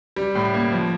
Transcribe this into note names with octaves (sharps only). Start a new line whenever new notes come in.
G3
A2
A#3
F3